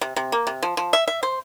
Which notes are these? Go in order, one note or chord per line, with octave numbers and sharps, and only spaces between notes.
C3
C3
A#3
C3
F3
F3
E5
E5
C5